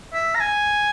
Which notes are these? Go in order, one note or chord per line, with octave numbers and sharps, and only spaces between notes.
E5
A#5
G#5